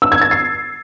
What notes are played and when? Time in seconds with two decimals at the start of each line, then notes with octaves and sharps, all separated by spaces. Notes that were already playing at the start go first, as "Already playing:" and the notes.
0.02 E6
0.12 G#6
0.21 A6
0.31 C7